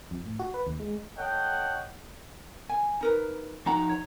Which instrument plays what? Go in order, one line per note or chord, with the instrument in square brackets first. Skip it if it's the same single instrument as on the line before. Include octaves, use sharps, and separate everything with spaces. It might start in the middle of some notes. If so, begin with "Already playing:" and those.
[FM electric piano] F2
A2
F#4
B4
D#2
G#3
[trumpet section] A4 C#5 D#5 F#5 G5
[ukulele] G#5
D#4 A#4 B4
[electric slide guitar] F3 D#4 A#5 [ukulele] F#4 F#5
[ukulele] C#5